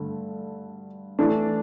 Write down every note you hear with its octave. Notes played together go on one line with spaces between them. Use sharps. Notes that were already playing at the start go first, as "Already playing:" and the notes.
Already playing: G2 D3 A3
E3 A3 D4